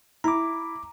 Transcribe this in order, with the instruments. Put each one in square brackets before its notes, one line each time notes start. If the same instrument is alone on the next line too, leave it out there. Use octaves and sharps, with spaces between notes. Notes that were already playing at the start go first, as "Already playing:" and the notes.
[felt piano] E4 [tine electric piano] A#5 D6